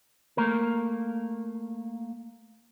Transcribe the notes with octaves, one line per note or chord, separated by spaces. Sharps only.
A3 A#3 A#4